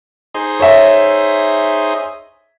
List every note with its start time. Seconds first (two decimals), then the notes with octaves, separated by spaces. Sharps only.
0.34 D#4 G#4 C5
0.60 C#5 E5